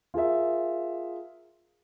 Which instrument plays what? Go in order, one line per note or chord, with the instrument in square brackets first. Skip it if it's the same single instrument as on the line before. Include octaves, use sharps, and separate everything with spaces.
[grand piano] F4 G#4 A#4 E5